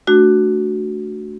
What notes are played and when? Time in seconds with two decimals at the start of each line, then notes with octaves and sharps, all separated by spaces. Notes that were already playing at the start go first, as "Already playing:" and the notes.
0.07 A3 D4 F#4